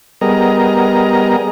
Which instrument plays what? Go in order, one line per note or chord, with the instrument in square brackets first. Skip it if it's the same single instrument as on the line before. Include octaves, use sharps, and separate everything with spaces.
[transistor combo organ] G3 B3 G#4 A#4 D#5 A#5